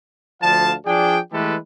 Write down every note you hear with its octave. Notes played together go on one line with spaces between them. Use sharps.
D2 D3 F3 F5 A5
F3 D4 G#4 D5 G5
E3 G#3 A3 G4 A4 B4